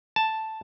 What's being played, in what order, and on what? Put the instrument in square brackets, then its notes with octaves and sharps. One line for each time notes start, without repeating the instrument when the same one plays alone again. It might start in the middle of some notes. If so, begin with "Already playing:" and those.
[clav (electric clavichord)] A5